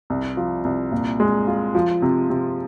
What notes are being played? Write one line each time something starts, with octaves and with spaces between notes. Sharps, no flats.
C2
F3
C2
A#2
G#3
F4
F3
C3
C3